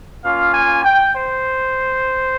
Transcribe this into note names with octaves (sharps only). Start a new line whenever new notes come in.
A#3 C#4 F4 F5
G#5
G5
C5